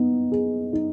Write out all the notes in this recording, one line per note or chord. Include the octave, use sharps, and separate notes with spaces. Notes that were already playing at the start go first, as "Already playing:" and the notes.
Already playing: B3 D#4
G#4
D#4